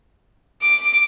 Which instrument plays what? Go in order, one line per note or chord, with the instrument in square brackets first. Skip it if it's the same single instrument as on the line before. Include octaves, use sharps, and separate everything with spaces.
[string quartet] D6